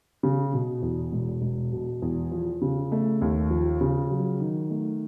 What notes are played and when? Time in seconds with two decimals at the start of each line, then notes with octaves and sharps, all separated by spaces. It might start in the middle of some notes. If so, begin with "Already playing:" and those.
0.23 C#3
0.53 B2
0.82 E2
1.12 E1
1.42 E1
1.72 B2
2.02 E2
2.31 F3
2.61 C#3
2.92 A3
3.21 D#2
3.50 F3
3.81 C#3
4.10 F#3
4.40 D#3
4.70 A3